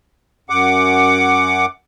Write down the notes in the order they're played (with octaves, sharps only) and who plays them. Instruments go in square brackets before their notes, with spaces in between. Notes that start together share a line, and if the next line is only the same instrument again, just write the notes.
[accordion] F#2 F#5 D6